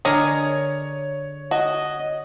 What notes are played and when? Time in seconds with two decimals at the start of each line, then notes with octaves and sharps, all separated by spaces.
0.05 D3 G#4 A#4 C#5 D#5
1.51 F#4 D#5